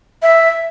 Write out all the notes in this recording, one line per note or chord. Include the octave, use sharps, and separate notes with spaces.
E5